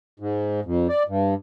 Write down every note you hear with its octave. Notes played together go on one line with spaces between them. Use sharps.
G#2
F2
D5
G2